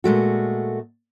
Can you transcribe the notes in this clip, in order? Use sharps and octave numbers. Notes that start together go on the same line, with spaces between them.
A#2 G#3 A3 F#4